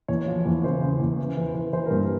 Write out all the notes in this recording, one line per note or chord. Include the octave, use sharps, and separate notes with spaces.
E2 C#5
F3
E2
C#3 C5
C#3
E2
E3
E3
E3
E3 C5
A#4
G2